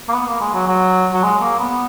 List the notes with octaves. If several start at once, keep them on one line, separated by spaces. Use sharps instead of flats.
A#3
B3
A#3
G#3
F#3
F#3
F#3
G#3
A#3
B3